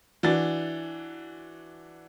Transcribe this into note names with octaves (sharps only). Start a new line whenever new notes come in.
E3 D4 F#4 A6